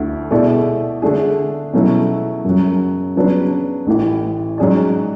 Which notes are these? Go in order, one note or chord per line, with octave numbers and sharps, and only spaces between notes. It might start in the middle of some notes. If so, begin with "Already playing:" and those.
Already playing: D2 D3 A3 E4
B2 A3 E4 G#4 D5
D3 A3 D4 G#4
B2 F#3 A3 C#4 E4
F#2 C#3 F#3
C#3 F#3 B3 D4
A1 A2 E3
G#2 F#3 C#4 G#4 D5